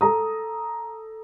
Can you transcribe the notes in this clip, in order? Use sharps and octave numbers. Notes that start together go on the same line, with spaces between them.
A4 A#5 D#6